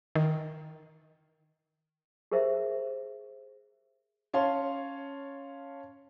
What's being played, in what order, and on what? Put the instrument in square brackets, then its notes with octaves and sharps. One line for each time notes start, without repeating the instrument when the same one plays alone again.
[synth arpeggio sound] D#3
[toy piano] G4 G#4 A#4 C5 E5
[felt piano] C#4 C#5 F5 A5 C6